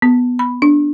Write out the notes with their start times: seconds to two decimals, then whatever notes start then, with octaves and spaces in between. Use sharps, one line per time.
0.02 B3
0.39 B5
0.62 D4